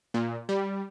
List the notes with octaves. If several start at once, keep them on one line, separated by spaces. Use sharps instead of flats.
A#2
G3